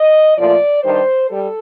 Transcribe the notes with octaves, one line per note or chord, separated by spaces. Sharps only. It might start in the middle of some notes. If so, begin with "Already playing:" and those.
Already playing: D#5
A#2 F3 A3 D5
G2 D#3 G3 C5
G3 A4